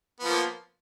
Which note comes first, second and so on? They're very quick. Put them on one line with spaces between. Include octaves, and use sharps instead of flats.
B3 F3 A#3